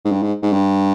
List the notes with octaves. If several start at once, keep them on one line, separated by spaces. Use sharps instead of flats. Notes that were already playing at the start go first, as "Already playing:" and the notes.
G#2
G2
G#2
G#2
G2